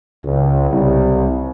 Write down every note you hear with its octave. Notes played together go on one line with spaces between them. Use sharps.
C#2
C2